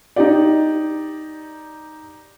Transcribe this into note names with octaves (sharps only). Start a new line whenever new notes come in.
D#4 G4 D5